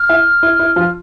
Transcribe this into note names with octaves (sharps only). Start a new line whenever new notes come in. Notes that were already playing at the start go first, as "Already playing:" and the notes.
Already playing: F6
E4 E5
E4
E4
F3 F4